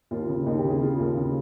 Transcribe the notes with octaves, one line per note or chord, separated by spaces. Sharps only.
D#2 F4
C#3
D#2 D#4
G4
C#3
G#4
C#3 F4
D#2
C#3